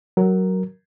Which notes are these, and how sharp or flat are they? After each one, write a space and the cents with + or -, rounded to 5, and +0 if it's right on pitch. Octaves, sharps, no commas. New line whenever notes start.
F#3 +15 A#4 +0